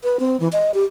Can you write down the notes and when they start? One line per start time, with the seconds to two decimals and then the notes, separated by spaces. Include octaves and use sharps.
0.03 B4
0.20 C4
0.40 E3
0.52 D#5
0.74 G4